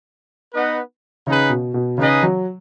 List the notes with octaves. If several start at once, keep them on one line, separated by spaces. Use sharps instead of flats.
B3 D#4 B4 D#5 F#5
C#3 D#4 G#4 B4
B2
B2
C#3 D#4 G#4 B4 D#5
F#3